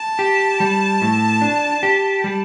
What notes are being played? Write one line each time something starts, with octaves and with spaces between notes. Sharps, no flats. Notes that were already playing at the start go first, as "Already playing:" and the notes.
Already playing: A5
G4
G3
A2
D4
G4
G3